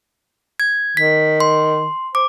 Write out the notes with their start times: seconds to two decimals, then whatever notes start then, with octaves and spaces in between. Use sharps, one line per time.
0.60 G#6
0.97 D#3 B6
1.40 C6
2.15 C5 D6